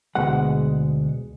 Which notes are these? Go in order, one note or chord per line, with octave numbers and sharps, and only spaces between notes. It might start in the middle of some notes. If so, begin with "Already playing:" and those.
D2 B2 G#3 F#5